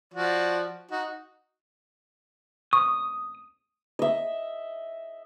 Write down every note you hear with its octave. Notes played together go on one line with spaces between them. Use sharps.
F3 F#4 D5
D#4 F#4
C#6 D#6
D#5 E5